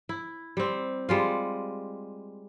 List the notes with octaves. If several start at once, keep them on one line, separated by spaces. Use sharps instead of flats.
E4
G3 C4
G3 G#3 F4